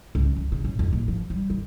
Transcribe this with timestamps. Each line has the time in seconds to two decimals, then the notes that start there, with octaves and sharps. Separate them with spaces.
0.15 C#2
0.36 F3
0.52 C#3
0.64 A1
0.79 F2
0.93 A#1
1.08 F3
1.30 G3
1.50 D#3